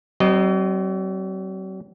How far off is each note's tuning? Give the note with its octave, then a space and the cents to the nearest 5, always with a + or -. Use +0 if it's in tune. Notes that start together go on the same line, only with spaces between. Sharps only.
F#3 +45 C4 +10 D#5 -15